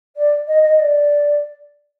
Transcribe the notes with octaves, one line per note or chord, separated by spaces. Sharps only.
D5
D#5
D#5
D5